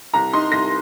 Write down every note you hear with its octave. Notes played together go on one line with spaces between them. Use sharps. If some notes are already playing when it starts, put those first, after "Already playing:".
C2 A#5
D#4 C6
C2 A#6